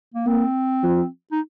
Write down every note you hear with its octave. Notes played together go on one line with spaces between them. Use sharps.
A#3
A#3 C4
F3
D#4